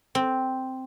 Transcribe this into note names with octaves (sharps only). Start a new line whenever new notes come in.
C4